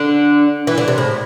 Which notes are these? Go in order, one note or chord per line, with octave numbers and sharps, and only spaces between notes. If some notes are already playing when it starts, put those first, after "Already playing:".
Already playing: D3
E3
D3
C3
A2